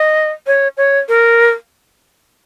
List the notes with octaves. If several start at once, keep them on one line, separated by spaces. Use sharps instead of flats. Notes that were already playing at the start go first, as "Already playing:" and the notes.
Already playing: D#5
C#5
C#5
A#4